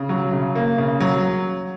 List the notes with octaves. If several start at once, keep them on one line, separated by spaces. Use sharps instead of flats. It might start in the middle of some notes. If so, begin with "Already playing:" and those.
Already playing: C#3
F#3
C#3
A#3
C#3
F#3